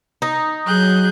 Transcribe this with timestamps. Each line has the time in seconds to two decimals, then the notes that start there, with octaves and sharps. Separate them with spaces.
0.22 D#4
0.66 F#3 G#4 F#6 G6